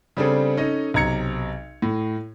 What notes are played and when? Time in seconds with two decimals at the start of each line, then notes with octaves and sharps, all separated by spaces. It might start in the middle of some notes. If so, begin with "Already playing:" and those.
0.17 C#3 G3 C4 D4 G#4 A4
0.57 C#4 D#4 A4 D#5
0.94 B1 C3 A#5 G#6 C#7
1.82 A2